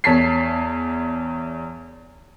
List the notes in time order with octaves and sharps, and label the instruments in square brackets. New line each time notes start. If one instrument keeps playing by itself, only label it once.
[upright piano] E2 C#5 A5 B6 C7